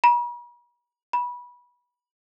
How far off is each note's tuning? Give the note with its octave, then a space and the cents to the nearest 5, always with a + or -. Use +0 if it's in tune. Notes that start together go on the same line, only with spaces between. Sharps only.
B5 -45
B5 -20